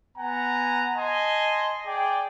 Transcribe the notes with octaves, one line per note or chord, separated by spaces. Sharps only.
B3 F#5 G#5 A#5
D#5 G#5 A5 C6
G#4 D5 G5